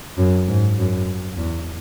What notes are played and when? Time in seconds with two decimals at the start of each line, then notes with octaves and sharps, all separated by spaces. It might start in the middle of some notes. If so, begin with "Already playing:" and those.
0.18 F#2
0.48 G#2
0.78 F#2
1.38 E2